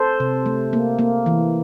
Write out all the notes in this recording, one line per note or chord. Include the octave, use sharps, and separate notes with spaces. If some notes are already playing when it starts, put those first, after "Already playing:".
Already playing: A4 C5
C3
A3
A#3
A#3
E3